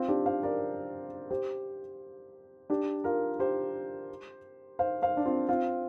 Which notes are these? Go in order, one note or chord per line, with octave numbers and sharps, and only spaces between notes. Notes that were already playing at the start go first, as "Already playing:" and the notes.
Already playing: C4 F4
D4 G4
C5 F5
A#4 D5
G4 C5
D4 G4
F4 A#4
G4 C5
C5 F5
C5 F5
D4
C4 F4
C4 F4